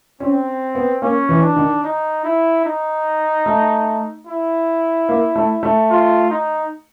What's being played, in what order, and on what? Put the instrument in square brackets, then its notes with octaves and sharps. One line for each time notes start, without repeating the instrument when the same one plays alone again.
[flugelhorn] C4 [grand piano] C#4
[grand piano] B3
[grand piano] A#3 [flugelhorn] C#4
[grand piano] E3
[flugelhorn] D4
[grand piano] D#3
[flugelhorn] D#4
E4
D#4
[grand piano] A3
[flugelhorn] E4
[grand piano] A#3
A3
A3
[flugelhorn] F4
D#4